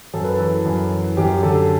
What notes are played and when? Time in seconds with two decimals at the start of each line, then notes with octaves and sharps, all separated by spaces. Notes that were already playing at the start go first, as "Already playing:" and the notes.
0.13 F#2 A4
0.24 B4
0.35 E3 A4
0.65 F#2
0.91 E3
1.17 F#2 G4
1.43 D3 A4